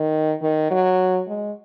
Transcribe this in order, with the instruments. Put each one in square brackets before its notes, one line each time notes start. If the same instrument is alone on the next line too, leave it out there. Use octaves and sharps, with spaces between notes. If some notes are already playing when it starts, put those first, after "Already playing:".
Already playing: [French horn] D#3
D#3
F#3
G#3